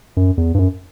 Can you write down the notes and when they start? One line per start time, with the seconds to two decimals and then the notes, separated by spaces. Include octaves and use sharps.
0.17 F#2
0.38 E2
0.54 G2
0.58 F#2